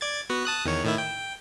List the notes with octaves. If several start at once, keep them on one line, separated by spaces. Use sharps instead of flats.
D5 G#6 A6
B3 F#4
A5 D#6 F#6
E2 D#3 C#5
A2 D#3 E4
G5